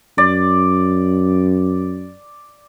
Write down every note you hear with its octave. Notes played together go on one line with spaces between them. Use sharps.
F#2 D5